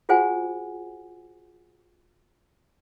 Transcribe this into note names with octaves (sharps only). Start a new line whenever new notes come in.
F4 F#4 G#4 C5 F#5 G#5